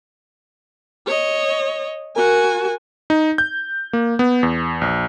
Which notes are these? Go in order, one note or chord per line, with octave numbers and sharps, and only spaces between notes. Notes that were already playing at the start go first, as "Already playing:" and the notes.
C#5 D#5
F#4 A#4 G#5
D#4
G6
A#3
B3
E2
A#1